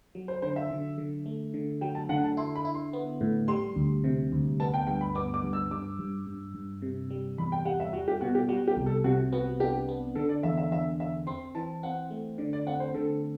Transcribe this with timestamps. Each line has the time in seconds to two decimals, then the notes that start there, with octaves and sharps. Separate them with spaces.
0.15 F#3
0.28 C5
0.42 D3 C5
0.56 E5
0.71 D3
0.98 D3
1.26 A3
1.54 D3
1.81 F#3 G5
1.95 A5
2.09 D3 F#5
2.24 A5
2.37 E4 C6
2.55 B5
2.65 E4
2.74 C6
2.93 B3
3.21 A2
3.48 G3 C6
3.76 D2
4.04 C3
4.32 D2
4.60 B3 A5
4.74 G5
4.87 G2 G5
5.01 B5
5.15 B3 D6
5.34 D6
5.43 G2
5.53 E6
5.71 G2 D6
5.99 G2
6.27 G2
6.54 G2
6.82 C3
7.10 G3
7.38 E2 B5
7.52 G5
7.65 G3 F#5
7.80 E5
7.93 G3 F#4
8.08 G4
8.21 B2 F#4
8.35 G4
8.49 G3 F#4
8.67 G4
8.77 C2
8.86 A4
9.04 C3 F#4
9.32 B3 F#4
9.60 D4 G4
9.89 B3
10.15 D3 A4
10.29 D5
10.43 E2 E5
10.57 E5
10.72 E2 E5
10.99 E2 E5
11.27 C4 C6
11.55 E3 A5
11.83 C4 F#5
12.11 A3
12.38 D3 D5
12.53 D5
12.67 C4 F#5
12.80 C5
12.94 D3 A4